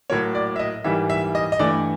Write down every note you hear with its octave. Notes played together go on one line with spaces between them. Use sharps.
A2 F#3 A#3 C#5
D5
E5
D#5
G#2 E3 G3 A#3 E5
E5
D#5
D#5
G2 E3 A3 D5